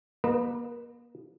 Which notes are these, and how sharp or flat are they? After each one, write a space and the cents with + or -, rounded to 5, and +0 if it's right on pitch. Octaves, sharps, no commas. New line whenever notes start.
A#3 +35 B4 +0 D#5 -20